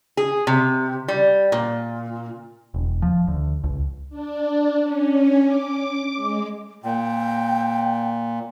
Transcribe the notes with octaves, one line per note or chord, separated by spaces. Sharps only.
G#4
C3
G3
A#2
E1
F3
D2
C#2
D4
C#4
D6
G#3
A#2 G5